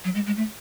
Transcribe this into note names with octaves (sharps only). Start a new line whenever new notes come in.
F#3
G#3
G#3
A3